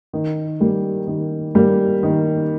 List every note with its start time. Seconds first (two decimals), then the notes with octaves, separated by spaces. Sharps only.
0.13 D#3
0.60 G3 A#3
1.07 D#3
1.55 G3 A#3
2.03 D#3